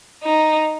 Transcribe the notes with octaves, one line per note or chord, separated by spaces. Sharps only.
D#4